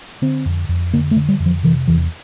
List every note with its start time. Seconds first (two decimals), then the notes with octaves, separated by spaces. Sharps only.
0.22 D3 C4
0.46 F2
0.69 F2
0.93 D3 A#3
1.11 A3
1.16 D3
1.29 G3
1.40 F2
1.46 F3
1.63 C3 E3
1.88 E2 E3